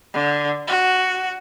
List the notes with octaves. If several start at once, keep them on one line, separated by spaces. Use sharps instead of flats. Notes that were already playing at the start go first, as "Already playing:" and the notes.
D3
F#4